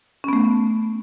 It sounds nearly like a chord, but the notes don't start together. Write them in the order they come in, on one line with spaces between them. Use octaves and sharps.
C#4 B3 A3